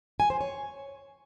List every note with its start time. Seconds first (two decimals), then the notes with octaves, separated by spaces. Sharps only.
0.20 G#5
0.30 C5
0.41 C#5